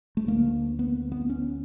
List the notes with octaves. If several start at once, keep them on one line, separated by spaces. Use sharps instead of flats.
A3
D2 D3 A#3
B3
B3
C#4